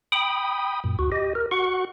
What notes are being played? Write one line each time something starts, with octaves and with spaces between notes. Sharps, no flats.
G5 B5 D#6
F#2 A#2
D2 F#4
G4 D#5
A#4
F#4 F#5 C#6